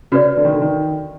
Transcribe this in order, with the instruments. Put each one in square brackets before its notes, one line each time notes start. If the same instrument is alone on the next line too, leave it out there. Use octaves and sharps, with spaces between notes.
[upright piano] C#3 [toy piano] F#4 B4 D5
[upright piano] D3
D#3
D3
D#3